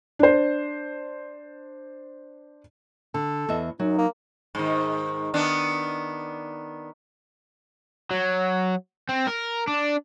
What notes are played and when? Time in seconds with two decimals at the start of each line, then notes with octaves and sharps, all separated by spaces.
0.19 D4 C5
3.14 D3 A4
3.49 E2 D#5 E5
3.79 F#2 F#3 D#4
3.98 A#3
4.55 G#2 D#3
5.34 D#3 B3 D4
8.11 F#3
9.09 C4
9.27 A#4
9.67 D4